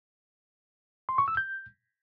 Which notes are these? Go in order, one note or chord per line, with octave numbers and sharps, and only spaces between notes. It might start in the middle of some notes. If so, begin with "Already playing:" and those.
C6
C#6
E6
G6